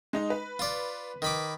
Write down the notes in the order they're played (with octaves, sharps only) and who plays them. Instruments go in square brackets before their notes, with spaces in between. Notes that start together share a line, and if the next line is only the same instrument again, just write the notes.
[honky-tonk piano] G#3 D#4 D#5
B4
[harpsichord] F4 D5
D#3 B5 D6